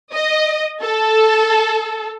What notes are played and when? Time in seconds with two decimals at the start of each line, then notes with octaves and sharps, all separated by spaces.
0.12 D#5
0.82 A4